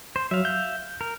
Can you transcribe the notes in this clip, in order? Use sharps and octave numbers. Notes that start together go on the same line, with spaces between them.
C5
F#3 E5 F5
G6
A#4